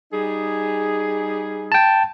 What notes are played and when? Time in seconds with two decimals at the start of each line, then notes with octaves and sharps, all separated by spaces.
0.12 G3 D#4 G#4
1.72 G5 A5